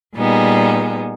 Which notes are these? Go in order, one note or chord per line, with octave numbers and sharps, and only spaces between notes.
A#2 G3 B3 D#4 G#4